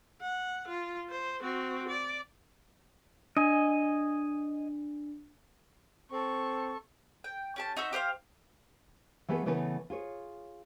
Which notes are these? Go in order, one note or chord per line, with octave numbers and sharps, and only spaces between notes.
F#5
F4
C5
C4 F#4
D5
D4 D#5 G#5
C4 A4 C#6
G5
C#4 G4 A5
D#4 F#4 C5 E5
G4 C5 D#5 F5
E3 A3 B3 G#4 B4
C#3 E3 A3 B3 A#4 B4
F4 G#4 C#5